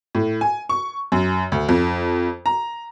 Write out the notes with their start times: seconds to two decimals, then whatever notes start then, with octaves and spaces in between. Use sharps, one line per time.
0.15 A2
0.41 G#5
0.69 C#6
1.12 F#2
1.52 D2
1.69 F2
2.46 A#5